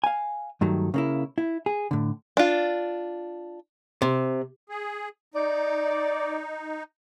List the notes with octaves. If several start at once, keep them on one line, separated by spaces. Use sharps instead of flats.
F5 G#5
G2 D#3 F#3 A3
C#3 A#3 E4
E4
G#4
A2 D3
D4 F4
C3
G#4
D#4 D5